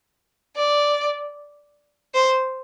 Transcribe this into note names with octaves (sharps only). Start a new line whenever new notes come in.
D5
C5